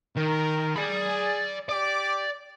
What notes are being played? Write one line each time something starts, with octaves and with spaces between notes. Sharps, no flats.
D#3 A#4
G#4 D5 B5
G4 D5 D6